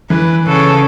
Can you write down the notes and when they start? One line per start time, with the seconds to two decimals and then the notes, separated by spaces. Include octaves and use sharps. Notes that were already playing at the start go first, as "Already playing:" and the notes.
0.10 E3 B4
0.47 C#3 A4